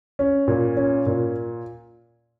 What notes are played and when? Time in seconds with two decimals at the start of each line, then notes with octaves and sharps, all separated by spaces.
0.19 C#4
0.48 A#2
0.77 C#4
1.06 A#2